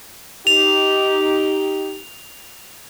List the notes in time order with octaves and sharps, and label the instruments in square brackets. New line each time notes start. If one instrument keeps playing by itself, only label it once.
[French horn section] D#4 G4 [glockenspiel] F7